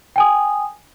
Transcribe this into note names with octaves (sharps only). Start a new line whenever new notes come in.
G5 G#5 D#6